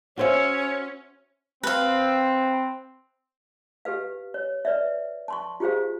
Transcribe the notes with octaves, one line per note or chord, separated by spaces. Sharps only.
C#4 F#4 C5 C#5 E5
C4 B4 F5
G4 A4 B4 F5
C#5
B4 D5 E5
A5 C6 C#6
F4 G4 G#4 C5 F5